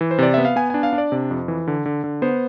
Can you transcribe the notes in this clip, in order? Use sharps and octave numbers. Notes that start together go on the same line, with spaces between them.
E3
C5
C3 D5
B3 E5
F5
B3 G#5
D4 G#5
F5
D4
D5
C3
F2
E3
D3
D3
D3
B3 C5